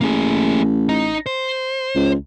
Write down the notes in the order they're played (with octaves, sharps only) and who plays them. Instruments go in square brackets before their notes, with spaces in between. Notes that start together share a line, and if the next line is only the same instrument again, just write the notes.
[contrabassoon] A1 [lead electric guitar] A#3 G#4
[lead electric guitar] D#4
C5
[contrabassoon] C#2